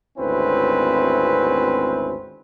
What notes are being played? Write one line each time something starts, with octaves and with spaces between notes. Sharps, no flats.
G#1 D2 C4 C#4 E4 B4